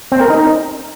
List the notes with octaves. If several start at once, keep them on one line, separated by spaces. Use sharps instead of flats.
C4
A#4
D#4